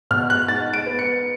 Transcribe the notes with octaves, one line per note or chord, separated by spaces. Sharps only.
B2 F6
F#6
G#2 A6
D7
B3
C#7